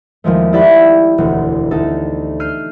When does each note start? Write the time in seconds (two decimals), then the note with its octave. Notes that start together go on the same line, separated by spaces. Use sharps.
0.24 D#2 F3 G#3 A3
0.53 E4 G4 D5 E5 G5 B5
1.18 E1 D2
1.71 D2 D#4 A4
2.40 E6 F6 G6 C7 D#7